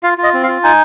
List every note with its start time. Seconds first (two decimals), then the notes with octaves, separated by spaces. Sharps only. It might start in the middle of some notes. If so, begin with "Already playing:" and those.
0.03 F4 F5
0.18 F4
0.23 D#5
0.34 C4
0.43 F5
0.48 F4
0.64 D#4 G#5